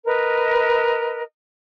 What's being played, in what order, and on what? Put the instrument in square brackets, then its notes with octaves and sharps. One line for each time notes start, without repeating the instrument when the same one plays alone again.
[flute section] A#4 B4 D#5